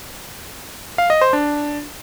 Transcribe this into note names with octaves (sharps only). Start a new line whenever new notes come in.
F5
D#5
C5
D4